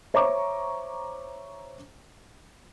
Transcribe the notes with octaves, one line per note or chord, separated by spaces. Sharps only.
C5 C#5 E5 A#5 C#6 D6